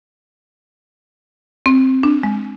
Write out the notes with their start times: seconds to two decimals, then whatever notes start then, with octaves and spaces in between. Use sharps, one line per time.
1.66 C4
2.03 D4
2.23 G#3